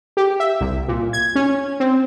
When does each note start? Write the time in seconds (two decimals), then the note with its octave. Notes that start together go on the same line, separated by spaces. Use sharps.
0.17 G4
0.40 E5
0.61 C2
0.88 A#2
1.13 G#6
1.35 C#4
1.80 C4